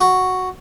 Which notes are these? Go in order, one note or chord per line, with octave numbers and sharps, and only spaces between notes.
F#4